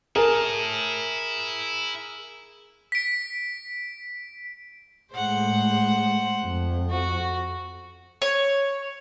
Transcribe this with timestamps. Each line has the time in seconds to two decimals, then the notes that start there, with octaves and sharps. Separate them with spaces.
0.16 E4 G#4 A#4 A5
2.92 B6 D7
5.13 A2 G#3 C5 F#5
6.44 F2
6.91 F#4
8.22 C#5